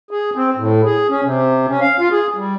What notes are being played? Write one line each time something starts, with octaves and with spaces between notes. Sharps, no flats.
G#4
C4
A2
G#4
C#4
C3
C#4
F5
F4
G#4
G3